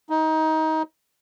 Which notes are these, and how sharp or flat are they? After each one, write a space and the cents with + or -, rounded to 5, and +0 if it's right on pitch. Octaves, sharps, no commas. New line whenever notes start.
D#4 +20